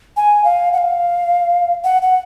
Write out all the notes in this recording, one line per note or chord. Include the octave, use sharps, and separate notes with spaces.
G#5
F5
F#5
F5
F#5
F#5